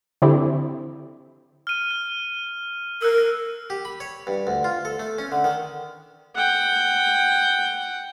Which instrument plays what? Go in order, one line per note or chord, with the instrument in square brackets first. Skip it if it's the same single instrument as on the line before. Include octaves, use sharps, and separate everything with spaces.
[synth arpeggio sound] D3 C4 E4 G4
[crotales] F6 D#7
F6
[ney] A#4 [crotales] E6 F#6
[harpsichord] G4
B5
C#5
G2
D2
F4
A4
A3
C#4
D3
D#3
[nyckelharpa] F#5 G5